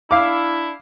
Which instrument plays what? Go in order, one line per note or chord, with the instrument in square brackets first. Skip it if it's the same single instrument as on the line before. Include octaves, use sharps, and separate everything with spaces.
[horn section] D4 E4 [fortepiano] F5 D6